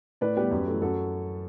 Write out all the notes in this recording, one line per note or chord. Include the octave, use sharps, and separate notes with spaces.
A2 B4 D5
G3 B3 G4 B4
F#2
E3 A3
F#2 F#4 A4